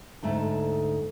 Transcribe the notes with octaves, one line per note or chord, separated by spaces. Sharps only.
D2 G#2 A3